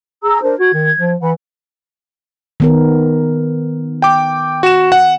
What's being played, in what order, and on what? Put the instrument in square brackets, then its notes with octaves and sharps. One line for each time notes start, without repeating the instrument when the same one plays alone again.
[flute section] G#4 A#5 E6
D4 A#4 C5
[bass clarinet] F#4 [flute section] G#6
[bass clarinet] D#3
F3
[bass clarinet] E3 [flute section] F#5 B5
[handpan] D#3 B3 A#4
[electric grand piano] G5 D6
F#4 E7
F#5